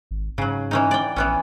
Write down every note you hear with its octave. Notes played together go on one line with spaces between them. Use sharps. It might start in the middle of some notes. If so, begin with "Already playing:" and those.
G#1
G#2 C#3 F#3
E3 C#4 D#4
D5 G5
A#1 E3 B3 C#4